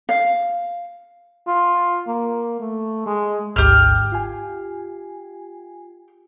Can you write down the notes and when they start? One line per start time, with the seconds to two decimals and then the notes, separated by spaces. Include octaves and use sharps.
0.09 F5
1.47 F4
2.07 A#3
2.60 A3
3.06 G#3
3.56 G#1 D2 G#2 G4 F6
4.12 F4 G#5